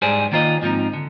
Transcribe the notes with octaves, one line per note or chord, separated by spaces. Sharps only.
G#2 G3 D4 G#4 C5
D#3 A#3 F4 C5 D#5
G#2 F3 C4 D#4
D3